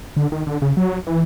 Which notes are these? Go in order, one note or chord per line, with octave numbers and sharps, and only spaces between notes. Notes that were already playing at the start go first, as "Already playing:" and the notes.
D3
D#3
D3
C#3
F#3
E3